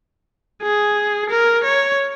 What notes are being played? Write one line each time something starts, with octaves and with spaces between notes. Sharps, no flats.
G#4
A#4
C#5